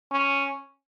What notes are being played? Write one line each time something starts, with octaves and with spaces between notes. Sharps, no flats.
C#4